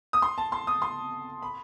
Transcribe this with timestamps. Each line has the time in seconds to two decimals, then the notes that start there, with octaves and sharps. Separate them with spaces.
0.13 D#6
0.22 C6
0.38 A5
0.52 C6
0.67 D#6
0.82 C6
1.42 B5